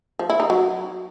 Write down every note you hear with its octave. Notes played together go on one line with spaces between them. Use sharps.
F3
E4
D#4
F#3